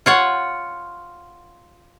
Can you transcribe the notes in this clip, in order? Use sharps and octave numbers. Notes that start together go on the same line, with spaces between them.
F4 C#5 F#5